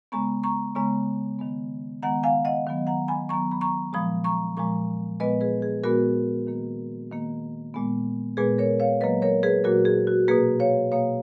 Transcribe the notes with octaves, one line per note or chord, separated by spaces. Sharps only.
C#3 G#3 B3 A#5 C#6
A#5 C#6
C#3 G#3 B3 A#5 C#6
D#3 G#3 B3
D#3 G#3 B3 F#5 A#5
F5 G#5
D#5 F#5
D#3 F#3 B3
F#5 A#5
G#5 B5
D#3 F#3 B3 A#5 C#6
B5
A#5 C#6
A#2 F3 G#3 B5 D#6
A#5 C#6
A#2 F3 G#3 A#5 C#6
A#2 G#3 B3 B4 D#5
G#4 B4
G#4
A#2 G#3 B3 F#4 A#4
D#3 A#3
D#3 A#3
A#2 G#3 B3
A#2 G#3 B3 G#4 B4
A#4 C#5
C#5 F5
A#2 F#3 A#3 B4 D#5
A#4 C#5
G#4 B4
A#2 F#3 A#3 F#4 A#4
G#4
F#4
B2 A#3 G#4 B4
C#5 F5
B2 A#3 C#5 F5